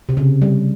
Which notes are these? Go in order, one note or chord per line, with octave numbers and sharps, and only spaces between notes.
C3
C#3
G3